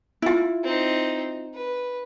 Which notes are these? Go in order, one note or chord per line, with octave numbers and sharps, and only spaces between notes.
E4 F4
C4 D#4
B4